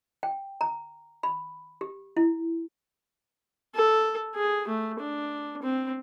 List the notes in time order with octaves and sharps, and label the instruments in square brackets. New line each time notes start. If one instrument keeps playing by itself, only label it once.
[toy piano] G5
A#5
B5
G4
E4
[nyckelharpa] A4
G#4
A3
D4
C4